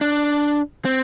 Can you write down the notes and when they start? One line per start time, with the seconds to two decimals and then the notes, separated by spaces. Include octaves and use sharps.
0.01 D4
0.85 C4